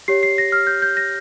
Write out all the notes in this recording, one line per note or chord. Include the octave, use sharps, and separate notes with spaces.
G4 C#5 C7
C7
A#6
F6
G6
G6
A#6